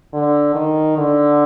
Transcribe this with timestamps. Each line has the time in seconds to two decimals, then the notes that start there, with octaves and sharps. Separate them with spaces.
0.13 D3
0.55 D#3
0.97 D3